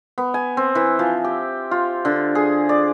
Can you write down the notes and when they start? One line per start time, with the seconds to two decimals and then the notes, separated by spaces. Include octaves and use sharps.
0.18 B3
0.34 G#5
0.57 C4
0.75 E3
0.99 F3
1.24 G4
1.71 F4
2.05 D3
2.35 G#4
2.69 D5